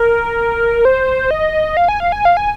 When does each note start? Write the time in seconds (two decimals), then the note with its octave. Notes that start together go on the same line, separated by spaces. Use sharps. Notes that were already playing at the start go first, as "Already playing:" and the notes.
Already playing: A#4
0.85 C5
1.31 D#5
1.77 F5
1.88 G#5
2.00 F5
2.12 G#5
2.25 F5
2.37 G#5